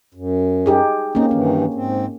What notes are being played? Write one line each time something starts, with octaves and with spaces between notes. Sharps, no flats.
F#2
D#4 G4 G#4
A#3 C4 C#4 D#4
G2 D#3 E3 C#4
G#2 C4